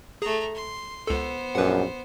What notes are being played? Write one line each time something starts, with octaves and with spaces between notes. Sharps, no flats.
A3 G#4 A#5
C6
C#2 B3 A4 C5
A#1 F#2 B4 F#5